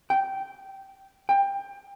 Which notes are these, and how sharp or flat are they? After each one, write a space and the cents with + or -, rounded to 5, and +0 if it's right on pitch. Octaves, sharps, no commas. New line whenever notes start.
G5 -15
G5 +20